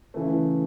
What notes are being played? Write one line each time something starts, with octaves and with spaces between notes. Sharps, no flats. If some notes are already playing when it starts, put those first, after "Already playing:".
C#3 E3 A3